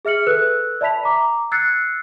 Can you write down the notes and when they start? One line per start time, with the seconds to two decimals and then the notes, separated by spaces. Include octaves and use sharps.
0.05 G#4 E5 F6 C#7 F#7
0.27 A4 B4 E6 F#6
0.81 D5 E5 A5 B5 B6 F7
1.03 A#5 D6
1.52 E6 F#6 G#6 A6 C7 C#7